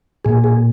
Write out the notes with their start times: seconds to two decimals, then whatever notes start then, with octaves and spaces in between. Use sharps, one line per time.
0.25 A#2 G#4
0.44 G#4